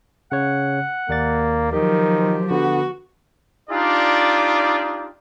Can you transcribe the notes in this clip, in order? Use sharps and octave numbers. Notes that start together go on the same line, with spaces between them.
C#3 C#5 F#5
D#2 A#3 D5 A6
D#3 F3 F#3 G4 A#4
D3 B3 F#4
D4 D#4 F4 G4 D5